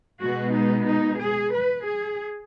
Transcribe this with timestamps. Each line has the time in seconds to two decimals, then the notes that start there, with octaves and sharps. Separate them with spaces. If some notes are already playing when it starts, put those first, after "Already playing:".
0.21 B2 G#3 B3 F#4
0.54 D#4
0.86 D#4
1.20 G#4
1.53 B4
1.86 G#4